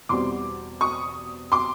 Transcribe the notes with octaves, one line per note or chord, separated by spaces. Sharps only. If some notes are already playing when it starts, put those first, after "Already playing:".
E2 B2 G3 C4 C6 D6
C#6 D#6
C6 D6